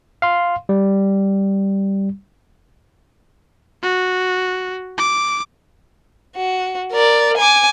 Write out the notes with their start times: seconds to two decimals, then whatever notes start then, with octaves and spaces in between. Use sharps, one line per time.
0.22 F5 C6
0.69 G3
3.83 F#4
4.98 D6
6.36 F#4
6.92 A#4 D5
7.37 G#5 D6